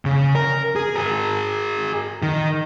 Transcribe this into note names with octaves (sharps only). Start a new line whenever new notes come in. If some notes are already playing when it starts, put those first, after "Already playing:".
C#3
A#4
G#4
G#4 A#4
D#3